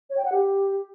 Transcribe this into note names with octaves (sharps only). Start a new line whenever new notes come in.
C#5
G5
F#5
G4